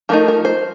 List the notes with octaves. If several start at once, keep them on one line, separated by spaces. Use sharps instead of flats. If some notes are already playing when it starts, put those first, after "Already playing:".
F3 A3 D#4 A#4
A#4
C5